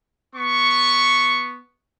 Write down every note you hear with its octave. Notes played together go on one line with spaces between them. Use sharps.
B3 C#6